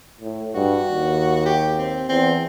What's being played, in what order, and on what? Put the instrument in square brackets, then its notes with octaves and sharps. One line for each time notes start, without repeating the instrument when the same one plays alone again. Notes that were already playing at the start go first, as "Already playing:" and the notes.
[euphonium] A2
[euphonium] G2 [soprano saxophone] F#4
[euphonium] D#2
[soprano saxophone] G4
C4
[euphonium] E2 [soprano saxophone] C4